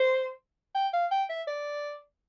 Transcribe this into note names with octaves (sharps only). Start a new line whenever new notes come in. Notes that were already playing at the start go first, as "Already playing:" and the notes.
Already playing: C5
G5
F5
G5
E5
D5